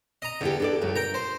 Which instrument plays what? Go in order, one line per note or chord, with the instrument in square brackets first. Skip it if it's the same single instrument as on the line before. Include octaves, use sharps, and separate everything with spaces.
[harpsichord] D#5 A#5
[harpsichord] E2 [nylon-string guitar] D3 E4 G4
[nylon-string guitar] D4 A4 D5
[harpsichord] C#2 [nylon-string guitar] F#2
[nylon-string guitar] A#4 [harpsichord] G5 A#5
[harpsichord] C5